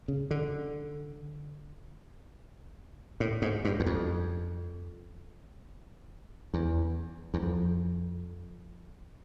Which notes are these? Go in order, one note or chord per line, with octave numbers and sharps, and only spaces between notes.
C#3
D3
A2
G#2
G2
E2
F2
E2
E2
F2